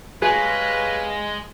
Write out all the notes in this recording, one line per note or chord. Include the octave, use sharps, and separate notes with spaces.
G#3 G4 G#4 B4 C#5 F5